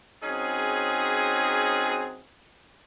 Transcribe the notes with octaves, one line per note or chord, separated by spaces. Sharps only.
F#3 C4 C#4 D#4 G#4